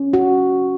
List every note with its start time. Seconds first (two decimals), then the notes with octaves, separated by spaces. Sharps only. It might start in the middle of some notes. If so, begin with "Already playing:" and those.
Already playing: C#4
0.13 F#4